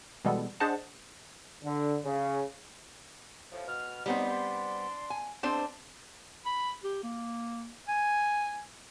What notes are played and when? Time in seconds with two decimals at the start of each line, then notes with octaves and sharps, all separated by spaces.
0.24 B2 E3 G3 G#3 B3 A4
0.60 D4 G#4 C5 D#5 F#5 A5
1.63 D3
2.04 C#3
3.52 A2 C3 F3
3.67 B2 F6
4.06 F#3 G3 B3 C4 D#4
4.27 D4 C6
5.10 G#5
5.43 E2 G#2 C4 D4 C5
6.46 B5
6.83 G4
7.03 A#3
7.88 G#5